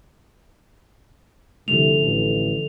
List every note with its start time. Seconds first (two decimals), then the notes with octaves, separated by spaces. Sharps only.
1.68 C2 D3 F3 A3 F7
2.01 A1